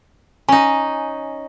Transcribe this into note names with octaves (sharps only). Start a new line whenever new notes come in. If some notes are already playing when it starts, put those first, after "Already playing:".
C#4 D#4 G#5